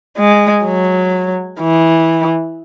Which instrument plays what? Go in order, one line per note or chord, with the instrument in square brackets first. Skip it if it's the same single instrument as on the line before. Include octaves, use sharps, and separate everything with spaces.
[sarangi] G#3
F#3
E3